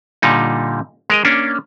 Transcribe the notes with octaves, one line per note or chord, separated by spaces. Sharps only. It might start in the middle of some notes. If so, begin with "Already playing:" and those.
A#2 D3 G3 D#4
G#3 A#4 D#5
A#3 C#4 D4